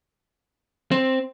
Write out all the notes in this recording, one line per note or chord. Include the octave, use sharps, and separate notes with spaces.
C4